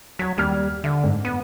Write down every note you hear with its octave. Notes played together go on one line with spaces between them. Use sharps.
F#3 G#6 B6
D#2 G3 F6
D3 E5
G#2
B3 D#7